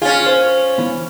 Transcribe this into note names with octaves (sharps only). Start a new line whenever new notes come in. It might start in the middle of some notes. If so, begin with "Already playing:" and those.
C#4 F4 G#4
C5
E3 B3